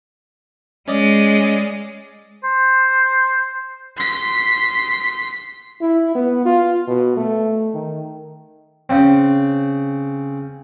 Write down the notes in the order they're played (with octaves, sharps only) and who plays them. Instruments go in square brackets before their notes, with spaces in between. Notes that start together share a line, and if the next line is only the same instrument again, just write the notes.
[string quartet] G#3 [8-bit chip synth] C#4 D5 D#5
[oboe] C5
[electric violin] C6 B6
[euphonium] E4
B3
F4
B2
A3
D#3
[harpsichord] C#3 C4